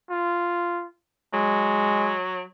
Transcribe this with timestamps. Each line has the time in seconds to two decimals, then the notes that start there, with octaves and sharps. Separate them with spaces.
0.10 F4
1.33 F#3 G#3